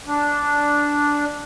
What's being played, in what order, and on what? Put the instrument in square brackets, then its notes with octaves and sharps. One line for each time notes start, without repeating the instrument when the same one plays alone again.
[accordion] D4